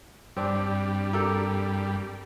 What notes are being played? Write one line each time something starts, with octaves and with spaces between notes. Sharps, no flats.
G2 G3 C4 D4
G4 A4 A#4